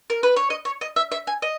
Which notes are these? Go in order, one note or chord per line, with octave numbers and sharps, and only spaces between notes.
A#4
B4
C#5
D#5
C#5
D#5
E5
E5
G#5
D#5